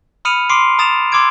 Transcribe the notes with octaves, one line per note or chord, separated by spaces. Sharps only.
B5 D#6 F6 C#7 D#7 F7
C6 D6 C7 D7
A#5 D#6 A6 E7 F7
C6 D6 E6 G#6 D7